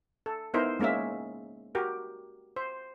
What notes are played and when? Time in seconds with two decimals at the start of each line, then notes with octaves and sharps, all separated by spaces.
0.26 A4
0.54 B3 D#4 E4 A#4 C5
0.80 G#3 A#3 C#4 A#4 E5
1.75 F#4 G4 A#4
2.56 C5